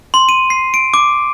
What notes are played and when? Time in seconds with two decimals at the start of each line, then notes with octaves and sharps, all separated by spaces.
0.14 C6
0.29 D#7
0.50 C7
0.74 D7
0.94 D6